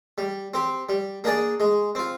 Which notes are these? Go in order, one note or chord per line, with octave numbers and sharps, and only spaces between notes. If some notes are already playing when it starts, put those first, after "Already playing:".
G3
C4 G4
G3
A#3 D4 G#4 D5
G#3
C4 F4